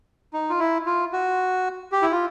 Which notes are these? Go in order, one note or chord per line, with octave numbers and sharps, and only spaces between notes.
D#4
F4
E4
F4
F#4
G4
E4
F4